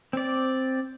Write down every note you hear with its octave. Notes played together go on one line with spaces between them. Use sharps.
C4 D5